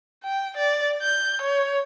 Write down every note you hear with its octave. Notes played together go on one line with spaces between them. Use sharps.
G5
D5
G6
C#5